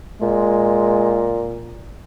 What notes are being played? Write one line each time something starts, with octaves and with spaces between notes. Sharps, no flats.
A#2 G#3